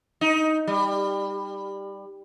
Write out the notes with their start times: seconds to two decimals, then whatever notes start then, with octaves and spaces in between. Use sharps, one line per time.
0.21 D#4
0.67 G3